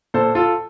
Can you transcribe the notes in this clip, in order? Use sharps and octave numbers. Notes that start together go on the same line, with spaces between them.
A#2 A4 C5
F4 A4